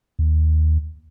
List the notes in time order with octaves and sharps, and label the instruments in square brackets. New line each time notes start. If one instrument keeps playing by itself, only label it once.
[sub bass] D#2